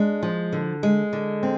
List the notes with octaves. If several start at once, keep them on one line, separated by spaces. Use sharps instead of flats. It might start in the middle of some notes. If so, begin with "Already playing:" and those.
Already playing: G#3 D4
F3
D3
G#3
D3
C4